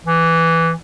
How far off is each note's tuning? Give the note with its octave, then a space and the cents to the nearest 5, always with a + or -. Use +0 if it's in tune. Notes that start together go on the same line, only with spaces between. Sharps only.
E3 +5